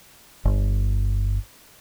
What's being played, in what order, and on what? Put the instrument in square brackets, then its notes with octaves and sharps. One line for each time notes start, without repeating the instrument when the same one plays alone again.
[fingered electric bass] G1